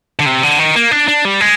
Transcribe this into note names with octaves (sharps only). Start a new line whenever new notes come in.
D3
C3
D3
D#3
A#3
D4
D4
G3
G#3